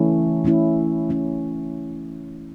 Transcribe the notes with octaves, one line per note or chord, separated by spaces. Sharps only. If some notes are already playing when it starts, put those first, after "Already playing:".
Already playing: E3 A3 C#4 E4
E3 A3 C#4 E4
E3 A3 C#4 E4